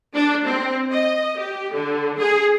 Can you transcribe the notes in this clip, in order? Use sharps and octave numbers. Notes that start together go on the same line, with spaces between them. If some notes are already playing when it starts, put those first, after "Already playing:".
D4
C4
D#5
G4
D3
G#4